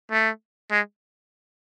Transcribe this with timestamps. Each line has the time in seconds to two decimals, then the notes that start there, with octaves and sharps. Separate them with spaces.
0.11 A3
0.71 G#3